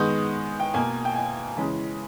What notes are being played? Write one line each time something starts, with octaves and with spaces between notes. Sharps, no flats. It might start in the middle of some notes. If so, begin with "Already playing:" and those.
Already playing: D#3 G#3 B3 D#6 G6
G5
B2 A#3 G#5
G5
G#5
C#3 E3 G#3